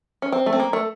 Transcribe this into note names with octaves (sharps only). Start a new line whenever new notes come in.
C#4
C4
A3
C4
A#3
A3